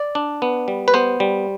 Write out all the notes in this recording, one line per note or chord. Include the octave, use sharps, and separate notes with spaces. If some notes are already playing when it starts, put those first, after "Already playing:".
Already playing: D5
D4
B3
G3
B4
B3 C5
G3